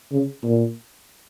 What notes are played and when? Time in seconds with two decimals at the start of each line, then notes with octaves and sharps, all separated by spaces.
0.12 C#3
0.44 A#2